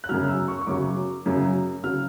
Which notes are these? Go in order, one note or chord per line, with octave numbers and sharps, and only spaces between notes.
F#6
F#2 C#3 F#3 F6
E6
C#6
C#6
F#2 C#3 F#3 D6
F#2 C#3 F#3
C#3 F#3 F6